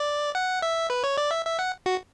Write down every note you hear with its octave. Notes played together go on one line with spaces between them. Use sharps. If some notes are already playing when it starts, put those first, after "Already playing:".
Already playing: D5
F#5
E5
B4
C#5
D5
E5
E5
F#5
F#4